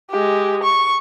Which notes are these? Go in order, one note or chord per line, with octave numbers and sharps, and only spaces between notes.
G#3 G4
C#6